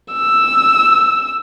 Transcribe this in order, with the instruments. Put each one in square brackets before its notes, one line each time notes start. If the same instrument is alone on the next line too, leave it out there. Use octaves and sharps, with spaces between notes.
[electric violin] E6